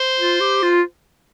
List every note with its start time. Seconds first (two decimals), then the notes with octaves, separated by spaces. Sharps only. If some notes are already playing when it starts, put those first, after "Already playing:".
Already playing: C5
0.19 F4
0.41 G4
0.63 F4